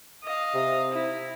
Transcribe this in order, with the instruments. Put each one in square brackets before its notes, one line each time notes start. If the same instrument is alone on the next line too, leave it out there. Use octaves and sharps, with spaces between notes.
[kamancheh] D#5 F5
[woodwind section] C3
[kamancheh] E4